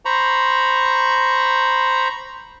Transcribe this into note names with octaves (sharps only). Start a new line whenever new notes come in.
C5 A#5 B5 C#6